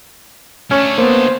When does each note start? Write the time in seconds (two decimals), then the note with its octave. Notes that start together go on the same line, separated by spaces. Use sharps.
0.71 D3 A3 C#4
0.98 A#3 B3 C5